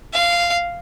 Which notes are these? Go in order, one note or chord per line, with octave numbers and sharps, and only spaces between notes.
F5